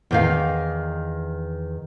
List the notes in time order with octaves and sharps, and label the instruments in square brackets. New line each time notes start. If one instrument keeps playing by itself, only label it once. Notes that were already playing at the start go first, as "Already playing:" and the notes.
[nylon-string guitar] E2 D#3 F5